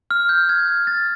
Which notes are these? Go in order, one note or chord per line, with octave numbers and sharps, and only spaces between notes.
F6
G6
G#6
A6